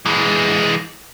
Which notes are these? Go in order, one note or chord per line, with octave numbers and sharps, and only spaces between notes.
E3 G#3